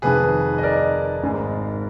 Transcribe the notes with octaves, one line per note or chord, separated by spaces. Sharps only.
F1 F2 D#3 G#4 B4
D#5
A#4 D5
G#1 G#2 D#3 G#3